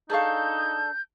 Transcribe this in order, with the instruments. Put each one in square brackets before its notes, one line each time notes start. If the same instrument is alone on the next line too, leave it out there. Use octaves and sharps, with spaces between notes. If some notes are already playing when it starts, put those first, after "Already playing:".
[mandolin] D4 A4 C#6 [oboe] D#4 [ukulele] G#4 F5 [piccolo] G6